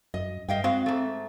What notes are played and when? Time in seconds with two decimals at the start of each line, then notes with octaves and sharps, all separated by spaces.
0.14 F#2 D#5
0.49 G2 D#5 F5 G5
0.64 G#3 C4 F#4 F5
0.86 G#2 A3